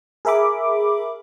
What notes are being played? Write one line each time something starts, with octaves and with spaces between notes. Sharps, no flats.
G#4 A#4 E5 B5 D6